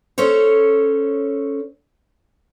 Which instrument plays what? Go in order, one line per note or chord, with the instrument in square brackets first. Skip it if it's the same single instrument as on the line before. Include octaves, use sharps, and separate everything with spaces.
[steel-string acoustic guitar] C#4 A4 C5 C#5